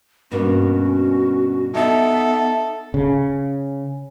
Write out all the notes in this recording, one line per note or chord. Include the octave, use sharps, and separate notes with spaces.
G2 B2 A#3 C#4 F#4
B3 D#4 A4 E5
C#3